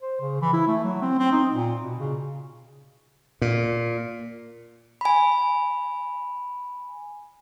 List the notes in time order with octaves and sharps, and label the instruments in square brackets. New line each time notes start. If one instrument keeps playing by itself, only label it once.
[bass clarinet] C5
C#3
E3
E4
A3
F#3
C4
C4
D#4
A#2
B2
C#3
[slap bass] A#2
[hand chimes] G#5 B5